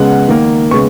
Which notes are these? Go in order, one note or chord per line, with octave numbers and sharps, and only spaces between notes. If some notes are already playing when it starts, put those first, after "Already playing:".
Already playing: C#3 G#3 B3 F#5
D#3 A#3
C#3 G#3 B3 C#6